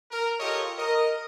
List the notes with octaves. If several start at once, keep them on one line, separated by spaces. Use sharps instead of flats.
A#4
F4 G4 A4 A#4 C#5 D#5
A#4 D#5